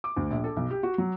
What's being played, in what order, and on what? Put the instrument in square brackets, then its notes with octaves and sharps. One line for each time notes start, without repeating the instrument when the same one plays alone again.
[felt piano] D6
D2
A#1
A4
B1
G4
F#4
F#3